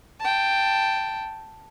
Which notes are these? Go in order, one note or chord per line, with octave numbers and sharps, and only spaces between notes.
G5 A5